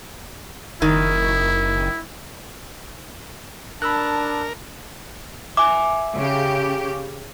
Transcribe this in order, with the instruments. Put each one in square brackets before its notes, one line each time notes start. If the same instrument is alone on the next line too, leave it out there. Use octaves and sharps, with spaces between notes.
[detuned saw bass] F#1 [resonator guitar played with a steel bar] D#3 [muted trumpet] E4
[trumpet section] D4 [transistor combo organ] A#4 [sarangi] A5 [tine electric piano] B5 E6 F#6
[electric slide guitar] E5 G#5 [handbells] D6
[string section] C#3 G4